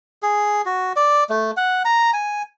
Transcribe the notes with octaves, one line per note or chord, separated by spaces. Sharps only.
G#4
F#4
D5
A3
F#5
A#5
G#5